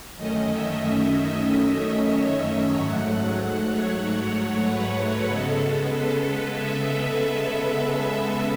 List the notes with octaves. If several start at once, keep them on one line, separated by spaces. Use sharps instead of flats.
F#2 D#3 A3 C#4 D#5
E5
D#5
D#5
C#5
E5
G#2 F#3 A3 F#5
F#5
C#5
B4
C#3 G#3 B3 A4
B4
E5